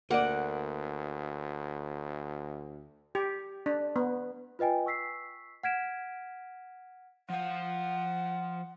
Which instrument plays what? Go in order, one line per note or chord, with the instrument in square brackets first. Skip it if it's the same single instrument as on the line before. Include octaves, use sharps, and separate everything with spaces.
[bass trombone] D2 [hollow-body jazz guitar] A#3 A#4 D5 [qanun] F#5
[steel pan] G4
D4
B3
[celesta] F4 B4 D#5 G5 G#5
C#6 E6 B6 C7
F#5 F6 G#6 B6 D7 E7
[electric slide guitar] F3 F5 [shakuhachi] F#5